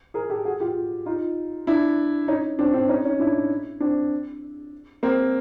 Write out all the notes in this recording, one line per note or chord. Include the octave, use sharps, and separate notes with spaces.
G#4 A#4
G4 A4
F#4 G#4
F4 G4
D#4 F4
D4 E4
C#4 D#4
C4 D4
C4 D4
C#4 D#4
C#4 D#4
D4 E4
C4 D4
A#3 C4